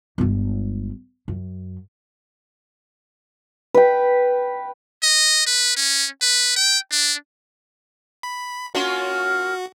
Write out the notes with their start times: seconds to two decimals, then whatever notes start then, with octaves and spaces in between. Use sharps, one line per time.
0.18 G1 G#3
1.28 F#2
3.74 B4 G5
5.03 D#5
5.46 B4
5.77 C#4
6.22 B4
6.56 G5
6.92 D4
8.23 B5
8.75 A#3 C#4 F4 F#4